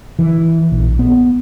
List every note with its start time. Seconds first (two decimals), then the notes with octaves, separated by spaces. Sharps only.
0.19 E3
0.72 A#1
0.99 B3